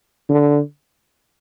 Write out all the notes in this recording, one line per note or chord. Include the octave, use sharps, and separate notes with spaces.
D3